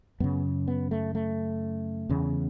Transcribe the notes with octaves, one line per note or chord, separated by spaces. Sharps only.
F#2 C#3 B3
B3
A3
A3
E2 C#3